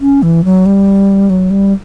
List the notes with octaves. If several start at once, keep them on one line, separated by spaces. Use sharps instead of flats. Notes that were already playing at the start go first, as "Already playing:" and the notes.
C#4
E3
F#3
G3
F#3
G3